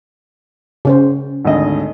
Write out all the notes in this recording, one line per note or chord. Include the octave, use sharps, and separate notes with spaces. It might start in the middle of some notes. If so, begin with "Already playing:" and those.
C#3 C#4 C5
G#1 D2 D#5